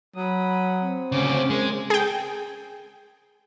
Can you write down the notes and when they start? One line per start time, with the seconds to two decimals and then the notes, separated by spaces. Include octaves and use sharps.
0.16 F#3 B5 D#6
0.80 C4
1.12 D2 C#3 C#4 D6
1.50 G#3 A#4
1.90 G#4 G5